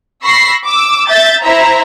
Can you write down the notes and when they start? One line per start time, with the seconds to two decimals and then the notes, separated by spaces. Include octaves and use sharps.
0.23 B5 C#6 E6 A#6 C7
0.65 D6 E6
1.07 E5 G6 A6
1.42 E4 C5 E5 A#5